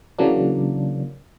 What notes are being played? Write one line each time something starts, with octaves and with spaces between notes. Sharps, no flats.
C#3 E3 F#3 A#3 D4